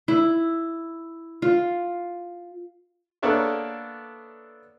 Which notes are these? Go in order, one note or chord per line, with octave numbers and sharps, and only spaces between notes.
E4
F4
A#3 B3 D4 A4 C#5 E5